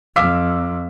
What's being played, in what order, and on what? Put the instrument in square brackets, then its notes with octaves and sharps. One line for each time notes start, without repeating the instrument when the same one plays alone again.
[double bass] F2 [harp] F5 [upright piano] D6 E6 B6